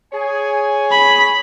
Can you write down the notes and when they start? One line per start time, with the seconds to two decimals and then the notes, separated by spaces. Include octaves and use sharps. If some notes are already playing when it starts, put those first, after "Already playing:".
0.13 G#4 C#5 G#5
0.92 B5